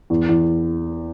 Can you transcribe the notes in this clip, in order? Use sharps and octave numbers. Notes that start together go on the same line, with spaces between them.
E2
E2